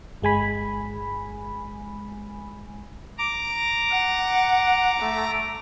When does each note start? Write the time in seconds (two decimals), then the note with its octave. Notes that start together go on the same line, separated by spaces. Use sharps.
0.22 G1 G#3 G#5 B5
3.18 A#5 D6
3.91 F#5
5.00 A3